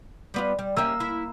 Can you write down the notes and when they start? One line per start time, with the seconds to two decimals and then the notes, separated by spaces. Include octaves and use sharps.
0.34 G3 B3 F4
0.59 G3
0.77 A#3 C#4 G4 E5 E6
1.00 E4